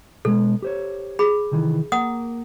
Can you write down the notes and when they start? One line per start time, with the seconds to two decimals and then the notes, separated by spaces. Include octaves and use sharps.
0.25 B2 G#3 A4
0.62 G4 C5 C#5
1.19 G#4 B5
1.52 C3 D#3 E3
1.92 A#3 A#4 F#5 D#6